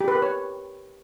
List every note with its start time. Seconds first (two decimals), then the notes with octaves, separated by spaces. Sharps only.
0.01 G4
0.08 B4
0.15 A#4
0.22 C#5